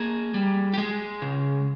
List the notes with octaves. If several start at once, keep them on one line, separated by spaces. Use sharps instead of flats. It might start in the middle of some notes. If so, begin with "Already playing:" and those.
Already playing: A#3 G#4
G3
G4
G#3 G#4
C#3